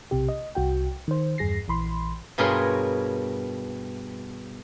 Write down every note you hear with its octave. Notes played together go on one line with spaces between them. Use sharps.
B1 C3 G4
D#5
C2 F#4 G5
D#3 C5
E2 G2 G#4 A#6 C7
A#1 E3 B5 C6
G2 B2 G#4 A#4 C#5 C6